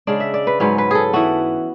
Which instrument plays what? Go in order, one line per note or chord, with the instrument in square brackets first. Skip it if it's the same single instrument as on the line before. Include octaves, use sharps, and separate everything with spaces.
[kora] C#3 G#3 D4 D5
E5
D5
B4
G#2 F#3 C#4 B4
B4
G#4 A4
E3 B3 F#4